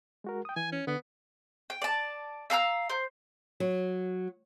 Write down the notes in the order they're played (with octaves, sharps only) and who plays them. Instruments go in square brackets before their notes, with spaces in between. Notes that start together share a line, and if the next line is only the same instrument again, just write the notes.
[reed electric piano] G#3 F#4 A#4
G5 D#6
[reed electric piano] E3 [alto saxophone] G#5
[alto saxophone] C#4
[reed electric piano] D3 [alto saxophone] B3
[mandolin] G5
D5 A5
E5 F5 A#5 E6
C5
[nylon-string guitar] F#3